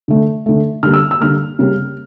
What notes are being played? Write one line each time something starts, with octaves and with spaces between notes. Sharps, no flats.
D3 A3
D3 A3
D3 G3 A#3 F6
E6
E6
D3 G3 A#3 F6
C#3 G3 A#3